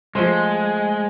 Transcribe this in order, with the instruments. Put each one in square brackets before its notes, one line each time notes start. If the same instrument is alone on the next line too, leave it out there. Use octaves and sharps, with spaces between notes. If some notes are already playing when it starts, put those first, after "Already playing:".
[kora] F3 A3 C5 [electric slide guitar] G#3